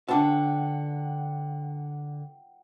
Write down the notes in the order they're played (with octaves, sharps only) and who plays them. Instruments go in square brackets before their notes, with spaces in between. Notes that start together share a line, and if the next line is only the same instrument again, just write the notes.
[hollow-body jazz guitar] D3 D4 A5 [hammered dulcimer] F#5 G5